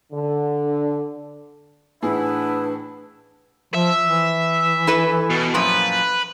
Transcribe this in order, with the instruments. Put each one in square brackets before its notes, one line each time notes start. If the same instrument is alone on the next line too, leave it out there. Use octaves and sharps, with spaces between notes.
[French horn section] D3
[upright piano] A2 E3 G#4 [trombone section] B3 E4 [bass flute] D4 [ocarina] B4
[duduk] F3 [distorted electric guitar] E5
[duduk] E3
[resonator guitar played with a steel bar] E4 A4 B4
[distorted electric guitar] B2
[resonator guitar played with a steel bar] F#2 A#2 F3 [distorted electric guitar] B4